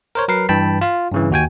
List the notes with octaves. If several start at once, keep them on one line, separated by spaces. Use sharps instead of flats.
A#4 C5 C#5
F#3 A#4 B4 C7
G2 E3 G5 A5 B5
F4 F5
G2 C#3 E3
D#2 F#4 G5 G#5